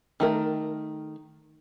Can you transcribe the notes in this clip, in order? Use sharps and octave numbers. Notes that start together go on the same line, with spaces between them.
D#3 A3 A#4